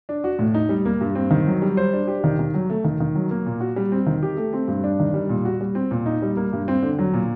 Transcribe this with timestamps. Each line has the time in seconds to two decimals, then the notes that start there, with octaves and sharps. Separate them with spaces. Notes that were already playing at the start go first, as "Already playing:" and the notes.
0.09 D4
0.24 F#4
0.39 A2
0.54 D#4
0.69 G3
0.85 A#3
1.01 G2
1.15 C4
1.30 D#3
1.47 F#3
1.62 G3
1.77 C5
1.93 D4
2.08 G4
2.24 D#3
2.39 D#3
2.54 F#3
2.70 A3
2.84 D#3
3.00 D#3
3.15 F#3
3.31 A#3
3.46 A#2
3.60 F#4
3.76 G3
3.92 C4
4.06 D#3
4.23 G4
4.37 A3
4.53 C4
4.68 G2
4.84 D4
5.00 D#3
5.14 G3
5.29 A#2
5.45 F#4
5.61 G3
5.75 C4
5.91 A#2
6.06 D#4
6.22 G3
6.37 A#3
6.53 G2
6.68 C4
6.83 D3
6.99 F#3
7.14 A#2